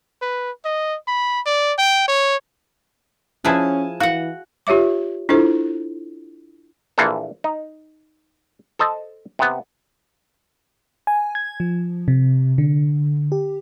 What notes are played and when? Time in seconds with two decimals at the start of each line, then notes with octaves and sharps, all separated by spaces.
0.22 B4
0.65 D#5
1.08 B5
1.46 D5
1.78 G5
2.08 C#5
3.45 F3 C#4 E4 G#4 G#5 A5 F#6
4.00 E3 F#4 F5 F#5
4.67 F4 G4 C#5 E5 D6
5.29 D4 E4 F4 A4 C5
6.98 A#1 E3 A#3 A4 C5
7.44 D#4
8.79 A4 C5 D#5 A5
9.39 C3 B3
11.07 G#5
11.35 G#6
11.60 F3
12.08 C3
12.58 D3
13.32 G4